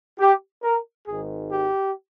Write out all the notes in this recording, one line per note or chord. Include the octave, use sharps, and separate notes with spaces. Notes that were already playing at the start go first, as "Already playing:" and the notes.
G4
A#4
G#1 G#2 D#3 G#4
G4